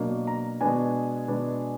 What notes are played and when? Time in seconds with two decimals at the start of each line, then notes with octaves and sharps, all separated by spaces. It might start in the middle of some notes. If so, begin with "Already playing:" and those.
Already playing: B2 F#3 A#3 D4
0.27 A#5
0.61 B2 G#3 B3 D4 G#5
1.28 B2 G#3 B3 D4